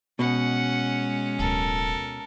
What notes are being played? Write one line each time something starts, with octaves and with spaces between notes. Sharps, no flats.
B2 G#3 C#4 F#5
D1 A4 A#4